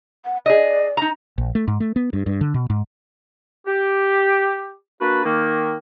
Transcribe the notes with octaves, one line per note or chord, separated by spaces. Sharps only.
F#5
G#4 D5 D#5
D#4 A#5
A#1
A3
G#2
A3
B3
G2
G2
D3
B2
G#2
G4
A#3 D4 F#4 B4
D#3 A#3